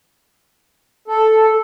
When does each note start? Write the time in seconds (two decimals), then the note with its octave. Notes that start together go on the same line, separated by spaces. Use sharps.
1.08 A4